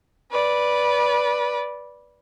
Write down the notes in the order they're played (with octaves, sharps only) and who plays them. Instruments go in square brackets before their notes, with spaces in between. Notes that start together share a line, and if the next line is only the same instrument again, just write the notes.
[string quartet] B4 D5